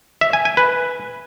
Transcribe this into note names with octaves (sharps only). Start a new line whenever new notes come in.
E5
G#5
G#5
B4